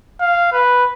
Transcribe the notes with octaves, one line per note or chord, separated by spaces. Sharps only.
F5
B4